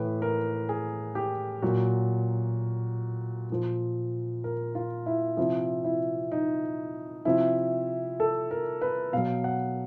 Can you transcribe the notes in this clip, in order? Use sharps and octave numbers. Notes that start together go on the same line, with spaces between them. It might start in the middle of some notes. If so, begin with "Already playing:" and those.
Already playing: A2 E3 B4
A#4
G#4
G4
A#2 F#3 F#4
A#2 F3
A#4
F4
E4
C3 F3 E4
E4
D#4
C3 F3 E4
A4
A#4
B4
B2 F#3 F5
F#5